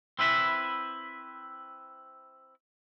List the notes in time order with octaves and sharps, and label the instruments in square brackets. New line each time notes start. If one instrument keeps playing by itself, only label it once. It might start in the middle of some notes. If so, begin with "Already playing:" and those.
[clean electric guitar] C4 E4 B4 E5